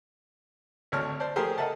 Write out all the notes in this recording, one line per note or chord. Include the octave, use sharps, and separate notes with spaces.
G#1 D2 C#5 A5 F6
C5 D5 A5
F3 A3 G4 G#4 A#4 C5
A4 A#4 D#5 E5 F#5 A5